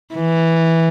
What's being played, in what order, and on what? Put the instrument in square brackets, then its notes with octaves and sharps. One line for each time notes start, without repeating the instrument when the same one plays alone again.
[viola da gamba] E3